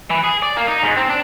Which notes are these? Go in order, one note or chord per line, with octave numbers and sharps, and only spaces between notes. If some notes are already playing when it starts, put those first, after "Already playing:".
E3
G#4
D5
A#3
D#4
G#2
C4
D4